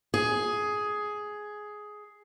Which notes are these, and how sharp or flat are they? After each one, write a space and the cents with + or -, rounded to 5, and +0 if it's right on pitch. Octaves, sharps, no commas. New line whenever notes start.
G#4 +10